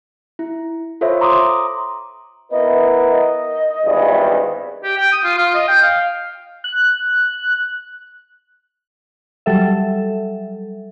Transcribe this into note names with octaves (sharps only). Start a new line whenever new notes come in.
E4
F4 A4 C5 C#5 E5
A#5 C6 D6 D#6
B3 E4 A#4 D#5
D#5
G#1 E2 G2
G4
G5
D#6
F4
F4
D#5
G5
F5
F#6
F#3 G3 A4 E5